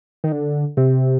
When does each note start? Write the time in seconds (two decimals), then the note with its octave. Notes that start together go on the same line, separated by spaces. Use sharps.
0.24 D#3
0.32 D3
0.77 C3